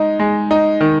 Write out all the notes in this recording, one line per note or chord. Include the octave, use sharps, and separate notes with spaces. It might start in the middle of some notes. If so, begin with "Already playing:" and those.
Already playing: G#3 D#4
G#3
D#4
D#3